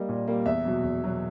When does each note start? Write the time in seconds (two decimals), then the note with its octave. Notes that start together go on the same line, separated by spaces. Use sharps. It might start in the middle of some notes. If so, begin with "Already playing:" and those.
Already playing: G3 A#3 D#5
0.09 A#2
0.27 G3 A#3
0.46 E2 E5
0.65 B2 F#3
0.83 E2
1.03 B2 F#3